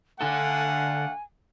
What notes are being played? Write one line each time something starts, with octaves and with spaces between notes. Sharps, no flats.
D3 A3 D4 A4 F5 F#5 G#5